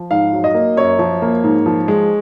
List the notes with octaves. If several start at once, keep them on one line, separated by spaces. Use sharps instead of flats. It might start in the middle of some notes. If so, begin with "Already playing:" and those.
Already playing: F3
G#2 F5
F#3
D#5
A#3
F#2 C#5
F3
A#3
G#2
F3
G#3